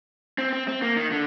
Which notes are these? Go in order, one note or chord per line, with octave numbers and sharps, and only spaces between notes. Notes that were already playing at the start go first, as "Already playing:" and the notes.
C4
C4
C4
A#3
D#3
D3